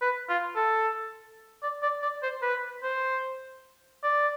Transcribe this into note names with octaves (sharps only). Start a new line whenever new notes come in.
B4
F4
A4
D5
D5
D5
C5
B4
C5
D5